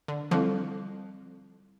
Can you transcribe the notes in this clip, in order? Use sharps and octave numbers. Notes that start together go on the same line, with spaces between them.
D3
D3 F3 G3 C4 E4 A4